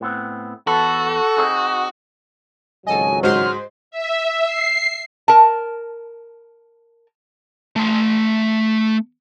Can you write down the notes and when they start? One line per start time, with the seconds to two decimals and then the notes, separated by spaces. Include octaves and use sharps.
0.01 A2 B3 C4
0.67 E2 F#4 A4 B4
1.37 C4 D#4 G#4
2.87 G#1 C#2 F#3 A4 D#5 G#5
3.23 G#2 F#4 C5 C6 F6
3.91 E5
4.47 C7
5.28 A#4 A5
7.76 A3 C6